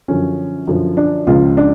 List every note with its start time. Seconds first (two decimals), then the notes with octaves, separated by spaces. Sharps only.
0.08 F#2 D3 F3 C#4
0.67 F#2 D3 F3
0.97 D4
1.27 C#2 C#3 F3 F4
1.57 D4